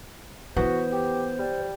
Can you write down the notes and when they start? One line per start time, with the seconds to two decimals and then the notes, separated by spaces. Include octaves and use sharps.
0.56 E3 B3 F#4 C5
0.92 G4
1.38 G3